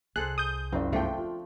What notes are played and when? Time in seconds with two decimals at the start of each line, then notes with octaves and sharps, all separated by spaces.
0.16 C2 G#4 A4 C5 F#6
0.38 D#6 G6
0.72 F#1 C#2 C4 D5
0.93 G1 F3 A3 D4 G5
1.18 F4